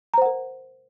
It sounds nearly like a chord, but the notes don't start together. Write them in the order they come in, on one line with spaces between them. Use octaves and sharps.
A#5 C5 F#5 A#4